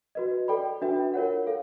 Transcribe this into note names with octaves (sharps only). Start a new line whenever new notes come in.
F#4 B4 D#5
A4 D5 G5 B5
D4 F#4 B4 E5 G5
F4 A#4 C#5 F#5
A4 F5